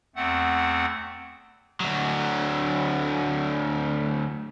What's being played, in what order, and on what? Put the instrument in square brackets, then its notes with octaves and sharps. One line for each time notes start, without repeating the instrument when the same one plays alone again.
[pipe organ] E2 A3 C4 F#5
[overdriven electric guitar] D2 F#3